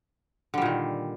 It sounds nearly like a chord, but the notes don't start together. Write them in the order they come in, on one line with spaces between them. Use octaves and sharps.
D3 G3 A#2 D#3